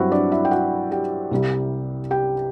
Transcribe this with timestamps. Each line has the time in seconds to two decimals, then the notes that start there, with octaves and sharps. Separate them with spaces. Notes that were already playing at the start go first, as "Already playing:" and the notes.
Already playing: G2 F#3 C4 E4 F#4 E5 F#5
0.12 D4 D5
0.32 E4 E5
0.45 G5
0.51 F#4 F#5
0.91 G4 G5
1.31 C2 C3 G3
2.11 G4 G5